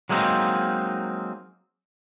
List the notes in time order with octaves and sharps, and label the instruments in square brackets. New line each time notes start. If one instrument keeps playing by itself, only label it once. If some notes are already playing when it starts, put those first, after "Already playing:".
[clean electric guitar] F#3 G#3 A#3 C4 D#4